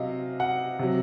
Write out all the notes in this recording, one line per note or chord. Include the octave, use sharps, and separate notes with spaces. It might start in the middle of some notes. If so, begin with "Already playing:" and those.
Already playing: C3 F#3 D#5 F5
F#5
C3 F#3